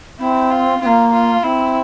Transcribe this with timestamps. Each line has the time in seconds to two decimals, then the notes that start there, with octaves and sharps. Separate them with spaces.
0.19 C4 E4
0.50 F4
0.81 C4 F4
0.86 A#3
1.13 F4
1.43 C4 E4